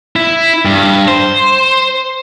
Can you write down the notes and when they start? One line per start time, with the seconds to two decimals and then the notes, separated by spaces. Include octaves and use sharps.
0.16 E4
0.65 G2
1.08 C5